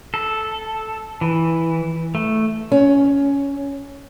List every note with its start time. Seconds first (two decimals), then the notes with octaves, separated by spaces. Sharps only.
0.14 A4
1.21 E3
2.15 A3
2.72 C#4